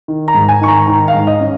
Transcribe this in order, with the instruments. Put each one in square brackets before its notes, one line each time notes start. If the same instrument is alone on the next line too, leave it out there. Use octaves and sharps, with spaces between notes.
[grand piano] D#3
A#5
G#2
G#5
D#3 C#6
A#5
D#3 A#5
F5
G#2
D#5
C#4